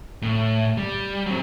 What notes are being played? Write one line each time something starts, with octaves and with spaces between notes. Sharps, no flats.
A2
G3
F#3 C4